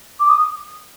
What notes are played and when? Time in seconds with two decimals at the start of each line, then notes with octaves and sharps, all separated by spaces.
0.20 D6
0.29 D#6